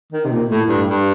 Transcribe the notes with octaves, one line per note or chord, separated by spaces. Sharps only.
D#3
C3
A#2
A2
G2
G2